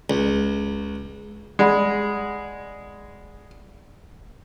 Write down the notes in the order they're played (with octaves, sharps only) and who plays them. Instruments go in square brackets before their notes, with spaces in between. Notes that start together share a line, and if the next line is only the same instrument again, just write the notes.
[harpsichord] C#2
[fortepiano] G#3 [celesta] D5 F#5 B5